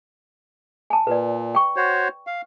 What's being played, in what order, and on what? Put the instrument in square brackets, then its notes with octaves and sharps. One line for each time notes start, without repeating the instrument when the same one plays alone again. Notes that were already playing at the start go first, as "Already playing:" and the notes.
[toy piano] G#5 A5
[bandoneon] A#2 [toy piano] B4 D5
[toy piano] G5 C#6
[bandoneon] F#4 C5 C#5
F5